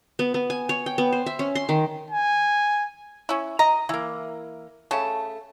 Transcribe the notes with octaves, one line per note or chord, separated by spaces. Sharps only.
B3
B3
G#5
C#5
G5
B3
C5
E5
C#4
C6
D#3
G#5
C#4 E4
D#5 A#5
E3 A#3 E4
C#3 A3 A5